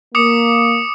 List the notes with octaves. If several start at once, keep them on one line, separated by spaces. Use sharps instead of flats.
A#3 D6 D#6 C#7